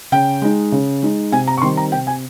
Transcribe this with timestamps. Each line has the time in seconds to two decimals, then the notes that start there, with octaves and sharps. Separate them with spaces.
0.12 C#3 G5
0.42 G#3 D#4
0.72 C#3
1.03 G#3 D#4
1.32 C3 G#5
1.48 A#5
1.57 C#6
1.62 D#3 G3 C4 C6
1.77 A#5
1.92 C3 G5
2.07 G#5